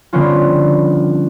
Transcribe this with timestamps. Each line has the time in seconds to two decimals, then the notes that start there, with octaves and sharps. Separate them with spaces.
0.13 D3 F3 G3 B3 C#4 F4